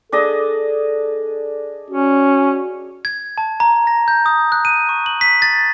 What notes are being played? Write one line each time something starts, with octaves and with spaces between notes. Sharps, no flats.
D4 G#4 A4 D#5
C#4 F#4
G#6
A5
A#5
A#6
G6
D#6
F#6
D#7
C#6
F#7
B6
A6